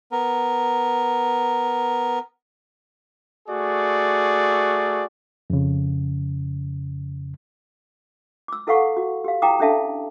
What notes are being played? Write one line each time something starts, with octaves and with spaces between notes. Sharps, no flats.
B3 A#4
A3 F#4 G#4 D5
F2 C#3
D6 E6
E4 A4 B4 F5 F#5 C#6
F#4
G4 F5
E4 F5 G5 A#5 D6 D#6
C#4 D4 A4 E5 F5 A5